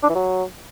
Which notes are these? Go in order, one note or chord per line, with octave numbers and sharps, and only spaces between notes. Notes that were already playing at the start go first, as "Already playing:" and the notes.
D4
E3
F#3